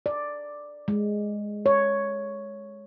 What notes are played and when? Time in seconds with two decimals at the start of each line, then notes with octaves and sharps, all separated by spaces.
0.06 D5
0.88 G#3
1.66 C#5